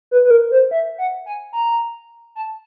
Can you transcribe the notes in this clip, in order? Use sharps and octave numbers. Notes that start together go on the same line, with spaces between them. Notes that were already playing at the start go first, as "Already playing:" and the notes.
B4
B4
A#4
C5
E5
F#5
G#5
A#5
A5